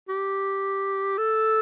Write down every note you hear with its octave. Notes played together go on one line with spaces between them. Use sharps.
G4
A4